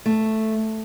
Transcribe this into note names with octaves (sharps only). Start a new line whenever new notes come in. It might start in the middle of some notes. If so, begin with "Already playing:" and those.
A3